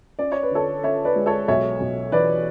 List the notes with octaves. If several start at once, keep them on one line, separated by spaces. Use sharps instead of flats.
C#4 D5
C#5
B4
D3 A4 C#5
C#4 C#5 E5
B4 D5
G#3
A4 C#5
B1 C#5 E5
B1
E3 B4 D5